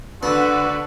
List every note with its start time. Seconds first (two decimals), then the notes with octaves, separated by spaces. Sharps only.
0.23 D3 B3 D4 F#4 B4 E6